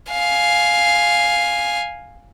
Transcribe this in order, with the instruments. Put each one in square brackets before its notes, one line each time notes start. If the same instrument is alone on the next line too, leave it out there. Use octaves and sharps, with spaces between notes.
[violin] F5 G#5